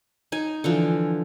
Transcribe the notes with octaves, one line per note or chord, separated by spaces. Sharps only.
D#4 G#5
D3 E3 F3